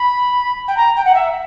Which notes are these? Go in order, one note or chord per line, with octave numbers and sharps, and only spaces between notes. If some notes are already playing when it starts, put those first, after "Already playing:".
Already playing: B5
G5
A#5
G5
F#5
E5